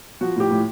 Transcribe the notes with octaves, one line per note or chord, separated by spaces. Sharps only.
F3 F#4
A2 G4
A2